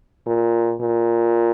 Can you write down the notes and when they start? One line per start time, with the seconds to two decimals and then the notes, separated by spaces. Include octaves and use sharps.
0.27 A#2
0.81 A#2